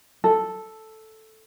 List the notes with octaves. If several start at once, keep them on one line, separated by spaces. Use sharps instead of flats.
A4